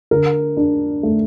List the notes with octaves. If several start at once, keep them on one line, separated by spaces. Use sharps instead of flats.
D3 A#4
D4
A3